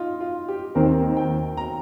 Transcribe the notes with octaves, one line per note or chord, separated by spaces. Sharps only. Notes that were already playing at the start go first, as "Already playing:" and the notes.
Already playing: D#4 F4
F4
G4
D#2 D#3 C4 A#4
G5
A#5